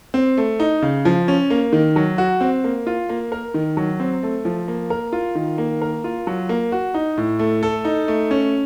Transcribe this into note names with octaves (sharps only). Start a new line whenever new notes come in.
C4
A3
D#4
C#3
F3
C#4
A#3
D#3
F#3
F#4
C4
A#3
F4
A#3
A#4
D#3
F#3
C4
A3
F3
A#3
A#4
F4
D#3
A#3
A#4
F4
F#3
A#3
F#4
D#4
A2
A3
A4
D#4
A3
C#4